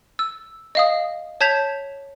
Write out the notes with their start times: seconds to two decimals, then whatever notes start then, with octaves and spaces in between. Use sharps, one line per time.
0.19 E6
0.75 D#5 F5 D#6
1.41 C#5 A5 G6 G#6 B6 F7